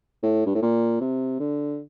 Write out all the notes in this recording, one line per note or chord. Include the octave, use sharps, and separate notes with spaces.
A2
G2
A2
A#2
C3
D3